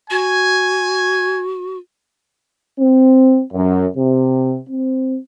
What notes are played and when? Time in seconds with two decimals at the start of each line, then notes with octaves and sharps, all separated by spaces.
0.10 F#4 G#5
2.79 C4
3.53 F#2
3.97 C3
4.69 C4